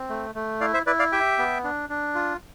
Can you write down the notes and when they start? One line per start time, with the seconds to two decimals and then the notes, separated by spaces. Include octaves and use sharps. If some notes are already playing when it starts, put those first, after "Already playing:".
Already playing: C4
0.09 A3
0.35 A3
0.61 E4 D5 F5
0.74 C5 E5
0.86 E4 B4 D5
0.99 D5 F5
1.12 G4 E5 G5
1.38 B3
1.64 D4
1.89 D4
2.15 F4